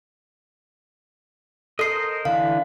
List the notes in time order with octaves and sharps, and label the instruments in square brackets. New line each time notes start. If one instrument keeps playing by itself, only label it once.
[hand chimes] A4 C7 [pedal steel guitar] A#4 C5 D#5
[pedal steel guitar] D3 E3 D4 [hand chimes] F5